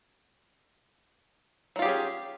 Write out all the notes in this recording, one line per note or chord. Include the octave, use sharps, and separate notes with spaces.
F#3 C#4 F4 G4 G#4